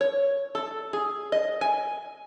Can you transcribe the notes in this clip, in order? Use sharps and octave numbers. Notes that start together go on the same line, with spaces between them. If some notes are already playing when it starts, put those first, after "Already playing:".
C#5
A4
G#4
D#5
G#5